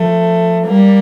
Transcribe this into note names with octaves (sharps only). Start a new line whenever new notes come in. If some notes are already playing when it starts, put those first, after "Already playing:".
Already playing: F3 A3
G3 A#3